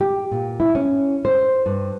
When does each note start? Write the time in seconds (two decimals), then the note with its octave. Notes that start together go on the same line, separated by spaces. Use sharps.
0.01 G4
0.31 A#2
0.60 E4
0.75 C#4
1.25 C5
1.66 G2